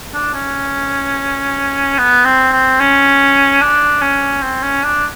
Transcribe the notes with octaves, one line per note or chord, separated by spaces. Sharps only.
D4
C#4
B3
C4
C4
C#4
D4
C#4
C4
C#4
D4